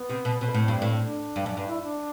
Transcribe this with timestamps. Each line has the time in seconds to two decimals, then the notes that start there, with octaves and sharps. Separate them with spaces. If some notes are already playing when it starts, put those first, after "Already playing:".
Already playing: B3
0.10 C3
0.25 B2
0.41 B2 C4
0.47 A3
0.52 A2 B3
0.62 C4
0.68 G2
0.82 A2
1.04 D4
1.36 G2
1.46 F#2
1.57 G2
1.67 E4
1.83 D4